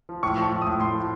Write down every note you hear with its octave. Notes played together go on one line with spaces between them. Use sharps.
F3
A2 C#6
F3
C#6
A2
D#6
A2
A2 C6
F3